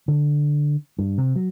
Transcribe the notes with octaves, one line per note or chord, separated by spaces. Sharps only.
D3
G2
C3
F#3